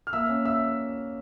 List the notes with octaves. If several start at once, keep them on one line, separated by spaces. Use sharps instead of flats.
F6
A#3 E5 E6
C#4
E5 E6